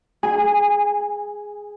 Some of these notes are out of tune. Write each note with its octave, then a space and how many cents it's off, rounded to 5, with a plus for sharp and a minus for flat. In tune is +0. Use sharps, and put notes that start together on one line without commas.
G#4 +0 G#5 -25